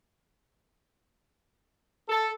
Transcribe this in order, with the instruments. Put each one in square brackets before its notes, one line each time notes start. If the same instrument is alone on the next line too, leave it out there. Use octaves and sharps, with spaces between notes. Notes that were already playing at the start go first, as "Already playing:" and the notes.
[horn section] A4